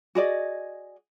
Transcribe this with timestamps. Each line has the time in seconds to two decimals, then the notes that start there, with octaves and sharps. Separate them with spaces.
0.15 F#4 G#4 D5 D#5